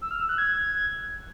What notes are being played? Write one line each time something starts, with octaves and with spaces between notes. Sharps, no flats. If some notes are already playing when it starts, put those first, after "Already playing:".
E6
F6
E6
F#6
G#6